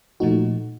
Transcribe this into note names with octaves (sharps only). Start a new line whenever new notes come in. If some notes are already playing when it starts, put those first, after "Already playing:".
A#2 F3 A3 D#4 F#4